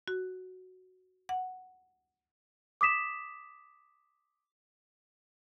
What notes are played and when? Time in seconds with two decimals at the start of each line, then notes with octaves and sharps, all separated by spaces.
0.08 F#4
1.29 F#5
2.81 D6 D#6 B6 E7